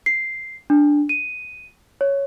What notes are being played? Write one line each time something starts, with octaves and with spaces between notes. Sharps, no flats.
C7
D4
D#7
C#5